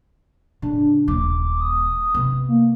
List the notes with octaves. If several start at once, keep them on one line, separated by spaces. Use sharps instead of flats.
A2 C#3 D4
D#1 A#3 D6
D#6
C3 B3
A#3